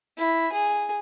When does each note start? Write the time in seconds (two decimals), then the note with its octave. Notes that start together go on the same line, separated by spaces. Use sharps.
0.18 E4
0.52 G#4